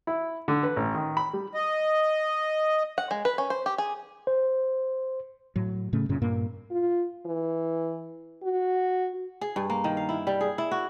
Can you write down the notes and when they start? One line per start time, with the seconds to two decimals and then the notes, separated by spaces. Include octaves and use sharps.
0.07 E4
0.48 D3
0.63 B4
0.76 A1
0.95 D#3
1.17 B5
1.33 G3
1.54 D#5
2.98 F#5
3.11 G#3
3.25 B4
3.38 C#4
3.50 C5
3.66 G4
3.78 G#4
4.27 C5
5.56 A2 F#3
5.93 A2 C#3 A3 C#4
6.09 F#2 A#2 C#3 C#4
6.22 G2 A#2 A#3
6.71 F4
7.26 E3
8.43 F#4
9.41 G#4
9.56 G2
9.70 A#3
9.84 D#3
9.97 F5
10.09 E4
10.27 G3
10.41 G#4
10.58 E4
10.71 F#4